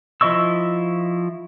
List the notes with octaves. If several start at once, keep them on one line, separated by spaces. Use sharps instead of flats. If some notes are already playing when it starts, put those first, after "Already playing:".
F3 E4 D#5 C#6 E6